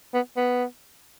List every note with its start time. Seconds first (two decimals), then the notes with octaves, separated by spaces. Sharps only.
0.14 B3
0.37 B3